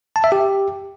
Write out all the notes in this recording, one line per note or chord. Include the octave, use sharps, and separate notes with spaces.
A5
E5
G4